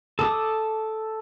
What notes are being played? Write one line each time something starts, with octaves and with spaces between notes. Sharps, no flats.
A4 A5 D6 D#6